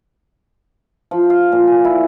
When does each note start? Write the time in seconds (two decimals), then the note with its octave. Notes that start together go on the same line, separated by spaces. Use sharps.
1.11 F3
1.30 F5
1.52 A#2
1.67 G#5
1.84 E4